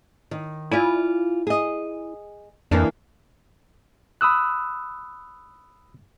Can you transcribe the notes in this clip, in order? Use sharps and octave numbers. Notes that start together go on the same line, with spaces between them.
D#3
E4 F4 D5 G#5
G#4 D#5
F2 E3 A#3 D4
B5 D#6 E6 F#6